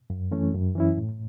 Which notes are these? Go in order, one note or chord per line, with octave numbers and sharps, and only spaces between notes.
F#2
E3 A3 C#4
F#2
E3 C#4 E4
A2